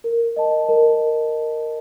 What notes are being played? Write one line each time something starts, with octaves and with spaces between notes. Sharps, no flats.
A#4
D#5 A5
A#4